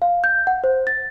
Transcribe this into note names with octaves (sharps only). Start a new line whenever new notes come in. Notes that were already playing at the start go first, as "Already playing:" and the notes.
F5
G6
F#5
C5
A6